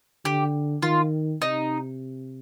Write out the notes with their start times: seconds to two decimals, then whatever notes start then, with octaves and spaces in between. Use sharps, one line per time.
0.25 D3 G4
0.83 D#3 F4
1.42 C3 D#4